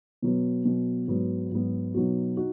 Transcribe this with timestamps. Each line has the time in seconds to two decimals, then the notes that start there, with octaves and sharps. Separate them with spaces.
0.22 B2 F#3 B3
0.65 B2 F#3 B3
1.08 G#2 F#3 B3
1.51 G#2 F#3 B3
1.94 B2 F#3 B3 D#4 F#4
2.37 D#4 F#4